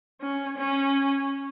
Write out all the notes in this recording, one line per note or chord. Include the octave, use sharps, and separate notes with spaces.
C#4
C#4